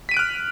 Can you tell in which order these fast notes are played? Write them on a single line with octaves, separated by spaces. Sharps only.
B6 D#7 D7 F#6 F6